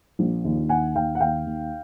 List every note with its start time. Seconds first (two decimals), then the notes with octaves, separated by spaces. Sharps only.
0.19 A#1
0.45 D#2
0.69 D#2 F#5 G#5
0.95 D#2 F5 G5
1.15 F#5
1.20 D#2 F5 G5
1.46 D#2